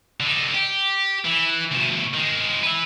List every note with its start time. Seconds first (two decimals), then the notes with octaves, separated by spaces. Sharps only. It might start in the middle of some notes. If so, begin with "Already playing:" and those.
0.20 D3 D#4
0.54 G4
1.25 E3
1.72 D2 B2
2.14 D#3 G#3
2.64 B4 E5